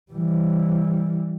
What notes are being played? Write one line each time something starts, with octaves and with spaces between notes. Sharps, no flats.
E3 G3